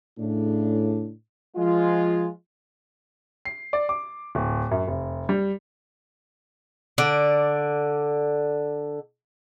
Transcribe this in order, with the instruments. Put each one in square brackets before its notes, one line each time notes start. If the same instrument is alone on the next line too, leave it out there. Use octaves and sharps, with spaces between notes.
[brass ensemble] A2 C#3 D4
F3 G#3 F4
[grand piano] C7
D5
D6
D1
F#2
F1
G3
[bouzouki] D3 D5